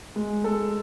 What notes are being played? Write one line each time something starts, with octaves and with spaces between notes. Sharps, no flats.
G#3
G#3 A4